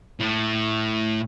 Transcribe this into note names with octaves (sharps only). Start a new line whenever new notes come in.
A2